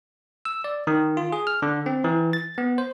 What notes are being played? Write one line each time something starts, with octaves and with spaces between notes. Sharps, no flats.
E6
D5
D#3
F4
G#4
F6
D3
C4
E3
A6
B3
C5